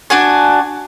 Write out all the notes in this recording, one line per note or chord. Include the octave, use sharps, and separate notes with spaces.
D4 F#4 G#5